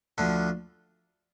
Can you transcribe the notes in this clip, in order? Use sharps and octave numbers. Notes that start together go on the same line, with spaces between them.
D2 D3 F3